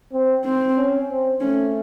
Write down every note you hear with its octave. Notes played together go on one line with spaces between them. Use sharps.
C4
C4
C#4
C4
A3 C#4